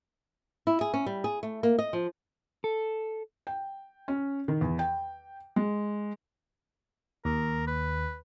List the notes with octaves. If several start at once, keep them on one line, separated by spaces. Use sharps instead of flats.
E4
G#4
C#4
G3
G#4
A3
A#3
D#5
F3
A4
G5
C#4
D#3
E2
G5
G#3
D#2 A#4
B4